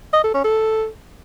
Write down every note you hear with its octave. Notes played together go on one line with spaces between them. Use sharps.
D#5
A4
C#4
A4